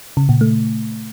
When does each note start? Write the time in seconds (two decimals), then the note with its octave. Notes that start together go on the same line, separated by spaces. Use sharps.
0.17 C#3
0.29 A#2
0.41 A3